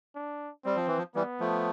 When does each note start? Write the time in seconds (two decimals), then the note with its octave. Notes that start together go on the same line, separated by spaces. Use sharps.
0.16 D4
0.65 G3 C4
0.76 F3
0.87 E3
0.98 F3
1.15 E3 G3 B3
1.40 F3 A3